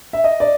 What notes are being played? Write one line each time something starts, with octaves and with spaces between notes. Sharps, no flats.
E5
D#5
D5